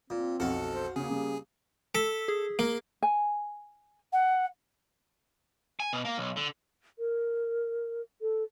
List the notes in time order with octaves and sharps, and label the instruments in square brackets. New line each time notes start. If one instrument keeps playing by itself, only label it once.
[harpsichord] A#2 [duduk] C4
[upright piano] B1 F2 [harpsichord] F#4 F5 F#5 [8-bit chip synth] A4
[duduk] C5
[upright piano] C#3 C#4 [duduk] A#3 [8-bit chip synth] G#4
[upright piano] C#3 G3
[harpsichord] A4 [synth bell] E6 B6
[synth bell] G#4
[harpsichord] A#3
[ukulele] G#5
[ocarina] F#5
[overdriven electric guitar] G#5
B2
A#3
B1
D3
[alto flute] A#4
A4